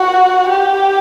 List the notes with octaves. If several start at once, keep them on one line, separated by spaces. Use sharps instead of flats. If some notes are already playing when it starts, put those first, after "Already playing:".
Already playing: F#4
G4